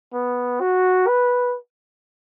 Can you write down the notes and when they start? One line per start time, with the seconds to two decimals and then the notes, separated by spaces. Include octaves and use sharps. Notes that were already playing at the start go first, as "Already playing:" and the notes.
0.13 B3
0.60 F#4
1.08 B4